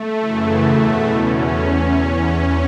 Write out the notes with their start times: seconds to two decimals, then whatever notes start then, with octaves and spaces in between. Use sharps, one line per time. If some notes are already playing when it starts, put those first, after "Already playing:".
Already playing: A3
0.17 F#2 C#3 E3
0.63 E2 B2
1.09 E2 C#4